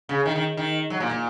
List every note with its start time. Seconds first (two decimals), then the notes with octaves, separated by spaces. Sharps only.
0.09 C#3
0.26 D#3
0.36 D#3
0.57 D#3
0.90 F#3
1.00 A#2
1.11 A#2